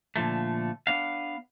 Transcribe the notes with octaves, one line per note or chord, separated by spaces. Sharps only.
A#2 D3 F3 A3
B3 D4 F5